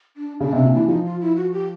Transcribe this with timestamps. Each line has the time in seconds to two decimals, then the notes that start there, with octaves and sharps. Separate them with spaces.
0.17 D4
0.40 C#3 D4
0.53 C3 D4
0.65 A#2
0.73 E3 D4
0.88 F3 D#4
1.05 F4
1.21 E4
1.36 F#4
1.52 G4